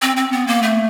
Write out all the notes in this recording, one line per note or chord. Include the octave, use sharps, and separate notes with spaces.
C4
C4
B3
A#3
A3